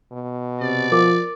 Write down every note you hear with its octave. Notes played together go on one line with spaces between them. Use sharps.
B2
C3 D5
F3 A#4 D6